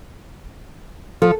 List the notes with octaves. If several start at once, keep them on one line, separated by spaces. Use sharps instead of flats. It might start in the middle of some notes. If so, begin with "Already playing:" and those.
F3 A4